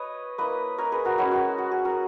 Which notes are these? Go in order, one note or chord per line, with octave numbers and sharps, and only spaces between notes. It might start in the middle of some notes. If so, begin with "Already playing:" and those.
Already playing: B4 C#5 D#5
A#3 E4 B4 D#5
A#4 C#5
G#4 B4
F#4 A#4
G#3 C#4 E4 F#4
F#4
F#4
G#4
F#4 A#4